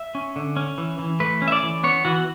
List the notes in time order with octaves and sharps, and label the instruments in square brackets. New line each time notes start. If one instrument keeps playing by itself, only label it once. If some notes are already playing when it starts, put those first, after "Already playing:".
Already playing: [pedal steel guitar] E5
C#4
D3
C#4
E3
E3
A3 B4
C#4
E5
D5
E3
B3 C#5
E3 F#4